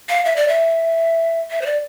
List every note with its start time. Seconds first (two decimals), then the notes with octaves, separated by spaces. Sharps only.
0.09 F5
0.25 E5
0.36 D5
0.48 E5
1.51 E5
1.62 C5
1.66 D5